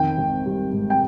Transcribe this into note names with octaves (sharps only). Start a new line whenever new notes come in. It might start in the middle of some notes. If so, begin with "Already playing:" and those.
Already playing: F2 D#3 G5
G#1
G3
G#2
G5